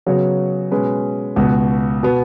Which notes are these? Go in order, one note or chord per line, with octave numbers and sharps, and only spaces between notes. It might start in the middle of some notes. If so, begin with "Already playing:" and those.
C#3 F#3 B3 F#4 C#5
B2 G#3 C#4 B4
C#2 B2 B3 F#4
B2 B3